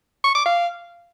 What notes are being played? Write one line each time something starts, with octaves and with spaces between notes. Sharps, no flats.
C#6
D6
F5